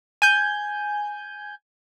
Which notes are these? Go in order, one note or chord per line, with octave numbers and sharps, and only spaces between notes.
G#5 G6